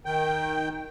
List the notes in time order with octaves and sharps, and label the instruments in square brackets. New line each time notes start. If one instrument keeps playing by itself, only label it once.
[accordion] D#3 G5